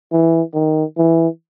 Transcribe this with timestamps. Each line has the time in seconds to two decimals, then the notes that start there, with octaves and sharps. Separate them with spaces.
0.12 E3
0.54 D#3
0.98 E3